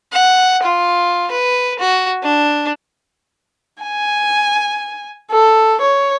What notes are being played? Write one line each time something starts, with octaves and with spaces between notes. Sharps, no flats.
F#5
F4
B4
F#4
D4
G#5
A4
C#5